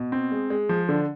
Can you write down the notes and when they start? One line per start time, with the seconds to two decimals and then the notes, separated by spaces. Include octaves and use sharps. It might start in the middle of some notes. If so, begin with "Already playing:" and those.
Already playing: B2
0.12 C4
0.32 G#3
0.50 G#3
0.69 F3
0.89 D3